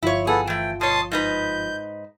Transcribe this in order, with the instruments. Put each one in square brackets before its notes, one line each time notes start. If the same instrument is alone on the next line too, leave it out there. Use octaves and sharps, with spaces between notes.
[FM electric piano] G1 F3 F4 [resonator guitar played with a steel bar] E4 C#5
[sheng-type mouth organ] B3 A4 [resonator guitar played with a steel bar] G#4
[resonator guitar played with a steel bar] E3 A3 [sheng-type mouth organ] G5
[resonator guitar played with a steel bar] B2 C#5 [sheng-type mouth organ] A5 C6 D#6
[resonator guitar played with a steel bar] G#2 D#4 B4 [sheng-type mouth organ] G6